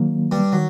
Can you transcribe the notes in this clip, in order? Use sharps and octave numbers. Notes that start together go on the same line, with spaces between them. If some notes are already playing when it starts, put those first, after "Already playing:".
Already playing: D#3 F#3 A#3
G2 G3
D#3 F#3